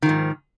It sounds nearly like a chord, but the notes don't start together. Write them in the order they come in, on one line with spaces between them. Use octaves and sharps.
D#3 F3 G#2